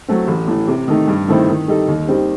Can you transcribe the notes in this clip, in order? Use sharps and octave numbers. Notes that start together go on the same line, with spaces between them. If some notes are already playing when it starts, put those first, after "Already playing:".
F#3 A3 C4
A1
A2 E3
C3
D#3 A3 D#4
G2
D#3 A3 C4 E4
D#3
G3 D#4 A4
D#2
D#3 G3 C4